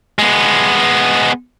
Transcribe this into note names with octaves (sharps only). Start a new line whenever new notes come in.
G#3 B3